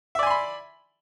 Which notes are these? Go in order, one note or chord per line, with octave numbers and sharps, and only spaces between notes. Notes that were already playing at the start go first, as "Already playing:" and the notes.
D5 E5 G#5 B5 C6